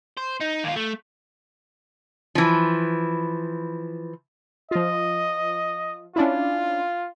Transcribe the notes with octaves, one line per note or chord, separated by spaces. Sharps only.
C5
D#4
D#2 F4
A3
E3 F3
F3 F4 D#5
C#4 D4 E4 F4